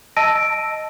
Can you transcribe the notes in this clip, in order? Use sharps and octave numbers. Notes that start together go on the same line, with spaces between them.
D#5 A5 E6 A#6 D7 D#7